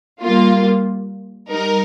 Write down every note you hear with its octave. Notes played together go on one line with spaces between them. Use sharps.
G3 A#3 F4
G3 D#4 A#4